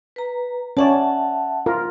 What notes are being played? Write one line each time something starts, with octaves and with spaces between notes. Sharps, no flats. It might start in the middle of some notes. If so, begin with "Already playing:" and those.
B4 A#5
C#4 C#5 D5 E5 F#5 A5
F4 A#4